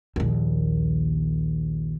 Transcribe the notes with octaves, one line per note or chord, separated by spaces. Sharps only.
A#1 D#2